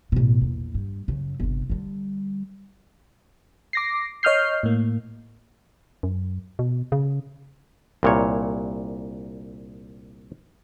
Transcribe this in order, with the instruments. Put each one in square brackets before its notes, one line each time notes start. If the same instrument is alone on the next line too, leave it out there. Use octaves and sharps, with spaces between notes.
[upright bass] A1 B2
A#1 E2
G2
F#2 C#3
G1 C3
D3 G3
[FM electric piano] D6 A#6 C7
C#5 D#5 D#6 F6 G6 C7
A2 A#3
[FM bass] F#2
B2
C#3
[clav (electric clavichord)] C2 A#2 C#5